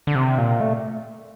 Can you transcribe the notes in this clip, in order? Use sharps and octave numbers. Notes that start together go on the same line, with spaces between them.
D3
C3
A#2
A3